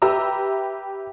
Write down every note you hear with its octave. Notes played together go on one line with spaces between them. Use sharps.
G4 B4 E5 A#5 E6